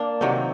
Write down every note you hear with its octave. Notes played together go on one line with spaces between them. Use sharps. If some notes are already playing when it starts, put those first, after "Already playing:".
Already playing: A#3 D4
C3 D#3 F#3 C4